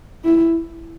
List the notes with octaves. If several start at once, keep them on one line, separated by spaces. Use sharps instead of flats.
E4